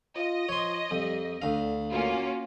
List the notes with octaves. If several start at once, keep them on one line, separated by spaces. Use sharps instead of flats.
F4 D#5
F3 C#5 C6
F2 G3
D2 D3 F5
A#3 C#4 F4 F#4